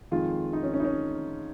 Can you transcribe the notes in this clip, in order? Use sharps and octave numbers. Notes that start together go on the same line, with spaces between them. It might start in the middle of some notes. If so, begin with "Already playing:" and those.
F2 D#3 G#3 F4
D#4
C#4
C#4
D#4
C#4